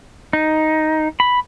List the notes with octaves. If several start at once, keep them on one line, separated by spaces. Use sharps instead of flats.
D#4
B5